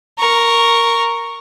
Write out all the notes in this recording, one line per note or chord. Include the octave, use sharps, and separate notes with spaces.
A#4 C#6